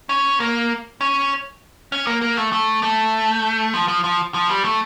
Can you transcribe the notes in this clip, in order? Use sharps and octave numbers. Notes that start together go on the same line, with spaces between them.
C#4
A#3
C#4
C#4
A#3
A#3
A3
A3
A3
F3
F3
F3
F3
G3
A3